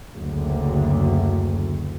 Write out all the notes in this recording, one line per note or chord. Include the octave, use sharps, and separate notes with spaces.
F#1 D2